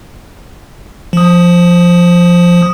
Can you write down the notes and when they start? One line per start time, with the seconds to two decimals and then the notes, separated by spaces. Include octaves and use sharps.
1.13 F3 D#6